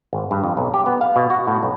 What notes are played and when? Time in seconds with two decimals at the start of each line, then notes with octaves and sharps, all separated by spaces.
0.13 G#1
0.31 G2
0.44 F2
0.57 B1
0.74 G4
0.86 B3
1.01 F5
1.16 B2
1.30 F#4
1.47 A2
1.63 B1